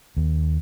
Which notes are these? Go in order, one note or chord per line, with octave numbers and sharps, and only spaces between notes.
D#2